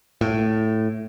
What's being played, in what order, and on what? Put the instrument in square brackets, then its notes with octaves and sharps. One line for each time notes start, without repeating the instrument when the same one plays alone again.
[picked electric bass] A2